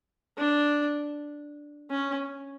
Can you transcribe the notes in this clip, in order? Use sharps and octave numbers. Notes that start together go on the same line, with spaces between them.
D4
C#4